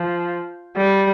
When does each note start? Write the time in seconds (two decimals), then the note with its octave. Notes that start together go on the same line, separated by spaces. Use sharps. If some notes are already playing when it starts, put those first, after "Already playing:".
Already playing: F3
0.77 G3